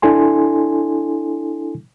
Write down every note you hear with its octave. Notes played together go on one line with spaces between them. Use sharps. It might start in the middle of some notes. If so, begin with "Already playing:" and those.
D4 E4 A4 G#5 C6